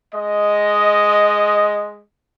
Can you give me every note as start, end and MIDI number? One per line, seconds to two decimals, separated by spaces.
0.15 2.02 56
0.15 2.02 75